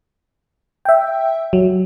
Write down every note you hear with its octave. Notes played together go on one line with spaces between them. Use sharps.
E5 G5
F#3